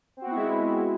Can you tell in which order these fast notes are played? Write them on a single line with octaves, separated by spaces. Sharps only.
C4 F#4 B3 E4 G#3